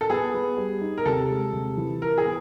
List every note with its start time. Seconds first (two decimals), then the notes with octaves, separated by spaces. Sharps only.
0.01 A4
0.10 B3 G#4
0.34 B3
0.57 G3
0.82 D#4
0.98 A#4
1.06 C3 A4
1.30 G#3
1.53 C3
1.77 E3
2.02 E4 A#4
2.18 G#4
2.25 B3